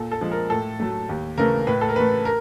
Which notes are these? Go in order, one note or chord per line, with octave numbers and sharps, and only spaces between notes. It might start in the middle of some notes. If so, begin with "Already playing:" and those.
Already playing: A#2 A4
A4
F3 G#3
A#4
A2 A4
F#3 A3
D#2
C#3 E3 A3 A#4
A2 B4
A4
A#4
E3 A3 B4
A#4